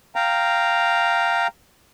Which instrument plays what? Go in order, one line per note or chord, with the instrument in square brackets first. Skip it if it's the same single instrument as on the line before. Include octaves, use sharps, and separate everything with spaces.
[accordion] F5 G5 A#5